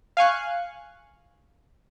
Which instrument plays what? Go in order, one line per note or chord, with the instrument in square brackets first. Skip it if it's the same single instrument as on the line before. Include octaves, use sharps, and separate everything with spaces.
[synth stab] F5 G#5 C#6 F#6